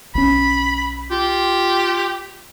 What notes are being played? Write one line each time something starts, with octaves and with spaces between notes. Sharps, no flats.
B1 C#4 B5
F4 G4